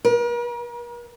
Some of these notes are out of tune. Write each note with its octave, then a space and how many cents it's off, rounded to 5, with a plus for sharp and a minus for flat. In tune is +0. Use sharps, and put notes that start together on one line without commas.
A#4 +45